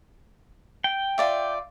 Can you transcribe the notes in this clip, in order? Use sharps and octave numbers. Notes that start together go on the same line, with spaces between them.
G5
F4 D5 E5